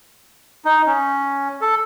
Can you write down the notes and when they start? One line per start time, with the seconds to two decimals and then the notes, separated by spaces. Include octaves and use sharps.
0.65 D#4
0.86 C#4
1.61 A4